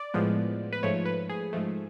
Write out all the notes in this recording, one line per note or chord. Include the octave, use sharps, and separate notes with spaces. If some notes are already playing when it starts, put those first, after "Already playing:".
Already playing: D5
A2 F3 G#3 B3
B4
G#2 F3 A3 C#5
B4
G#4
G#2 F3 A3